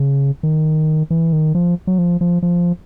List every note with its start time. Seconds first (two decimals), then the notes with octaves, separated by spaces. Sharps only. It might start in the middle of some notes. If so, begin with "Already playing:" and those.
Already playing: C#3
0.43 D#3
1.10 E3
1.33 D#3
1.55 F3
1.87 F#3
1.98 F3
2.21 F3
2.43 F3